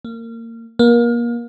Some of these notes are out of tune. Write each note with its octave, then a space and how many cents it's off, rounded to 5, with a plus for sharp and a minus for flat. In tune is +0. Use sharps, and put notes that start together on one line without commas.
A#3 -25
A#3 +30